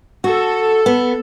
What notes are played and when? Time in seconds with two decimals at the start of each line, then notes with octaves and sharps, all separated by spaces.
0.24 F#4 A4
0.86 B3